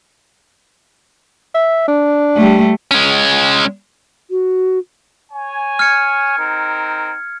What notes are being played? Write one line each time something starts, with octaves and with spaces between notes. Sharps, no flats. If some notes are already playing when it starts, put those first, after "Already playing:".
E5
D4
G3 A3
G#3 C#4
F#4
C#5 G#5
F6 G#6 C#7
C4 D#4 A#4